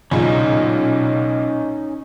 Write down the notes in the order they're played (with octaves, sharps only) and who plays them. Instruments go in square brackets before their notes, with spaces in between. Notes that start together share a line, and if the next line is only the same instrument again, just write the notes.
[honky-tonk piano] B1 A#2 C#3 [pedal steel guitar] C#4 D#4